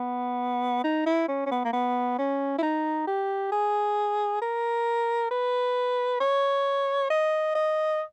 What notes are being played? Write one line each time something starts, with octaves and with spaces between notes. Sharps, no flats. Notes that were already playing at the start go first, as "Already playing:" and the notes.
Already playing: B3
D#4
E4
C#4
C#4
B3
A#3
B3
C#4
E4
D#4
G4
G#4
A#4
B4
C#5
D#5
D#5